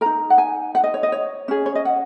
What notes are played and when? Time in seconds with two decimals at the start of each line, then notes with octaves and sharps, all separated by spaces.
0.01 D#4 A#4 A#5
0.30 F#5
0.38 G#5
0.75 F#5
0.84 D#5
0.94 C#5
1.03 D#5
1.12 C#5
1.48 C#4 G#4
1.66 C#5
1.75 D#5
1.85 F#5